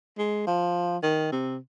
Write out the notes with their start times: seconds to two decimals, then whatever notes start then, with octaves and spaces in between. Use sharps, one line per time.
0.18 G#3
0.47 F3
1.03 D#3
1.32 C3